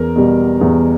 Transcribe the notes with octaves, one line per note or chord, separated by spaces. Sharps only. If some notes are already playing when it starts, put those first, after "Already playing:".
Already playing: E2 A#4
B2 G3
E2